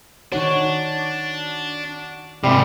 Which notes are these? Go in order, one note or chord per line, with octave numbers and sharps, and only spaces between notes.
D#3 D4 D#4 F#4 C#5
G#2 C3 G3